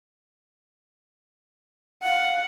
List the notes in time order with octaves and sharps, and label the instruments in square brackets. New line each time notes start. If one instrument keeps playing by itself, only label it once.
[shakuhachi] F5 [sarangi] F#5